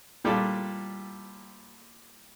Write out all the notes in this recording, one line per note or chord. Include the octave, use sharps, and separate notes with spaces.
A#2 G3 D4 F4 A4